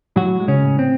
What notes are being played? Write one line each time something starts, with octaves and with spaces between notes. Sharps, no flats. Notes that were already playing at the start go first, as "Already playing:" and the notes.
A2 F#3 F#4
G#3
C#3 C#4
A2
C4